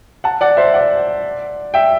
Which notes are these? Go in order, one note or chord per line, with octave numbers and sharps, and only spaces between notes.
F#5 A5
D5 F#5
C5 E5
D5 F#5
E5 G5